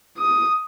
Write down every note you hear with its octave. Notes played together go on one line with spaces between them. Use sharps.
D#6